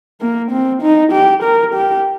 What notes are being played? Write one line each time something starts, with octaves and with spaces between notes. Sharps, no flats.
A#3
C4
D#4
G4
A#4
G4